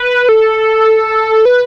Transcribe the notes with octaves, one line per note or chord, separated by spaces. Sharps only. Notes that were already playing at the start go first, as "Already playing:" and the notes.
Already playing: B4
A4
B4